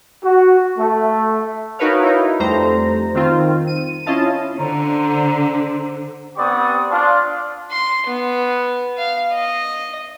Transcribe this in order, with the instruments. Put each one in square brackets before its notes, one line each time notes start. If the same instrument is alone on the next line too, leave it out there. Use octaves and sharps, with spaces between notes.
[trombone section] F#4
A3
[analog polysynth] D#4 F#4 A#4 B4 C#5 F5
D#4 E4
F2 G3 A3 C5 A#5
D#3 C4 F4
D#7
C#4 E4 F4 D#5 F5 A5
[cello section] D3 [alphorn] C5 [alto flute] A#5
[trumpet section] B3 C4 G4 D5 C#6 D#6
D4 F4
[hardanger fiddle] C6
B3
F5
D#5